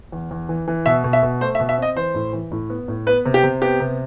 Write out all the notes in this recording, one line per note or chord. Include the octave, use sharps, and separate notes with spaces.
E2
E2
E3
E3
B2 E5
B2
E5
B2
A3 C5
E5
B2
E5
C4 D#5
E3 C5
A2
E3
A2
B3
A2
B3 B4
C3
G4
C3
B3 G4
C3